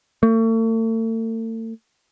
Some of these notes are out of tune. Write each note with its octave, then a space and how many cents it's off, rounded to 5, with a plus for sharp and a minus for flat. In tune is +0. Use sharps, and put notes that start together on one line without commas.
A3 +40